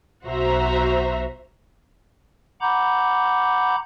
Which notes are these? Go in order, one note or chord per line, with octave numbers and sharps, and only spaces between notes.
B1 F#4 C5 E5 A#5
F#5 A#5 B5 D6 G6